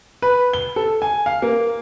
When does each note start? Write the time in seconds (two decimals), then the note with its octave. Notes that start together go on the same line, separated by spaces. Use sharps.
0.22 B4
0.53 G7
0.76 A4
1.02 G#5
1.26 F5
1.42 A#3